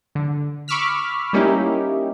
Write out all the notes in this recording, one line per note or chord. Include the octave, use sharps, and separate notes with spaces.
D3
B5 C#6 D6 E6 F6 B6
G3 A#3 C#4 D#4 E4 G4